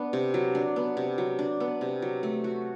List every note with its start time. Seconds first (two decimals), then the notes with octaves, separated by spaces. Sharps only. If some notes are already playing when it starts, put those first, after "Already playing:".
Already playing: B3 D4
0.13 C3
0.34 F#3
0.55 D4
0.76 B3
0.97 C3
1.18 F#3
1.39 D4
1.60 B3
1.81 C3
2.02 F#3
2.23 A3
2.44 F#4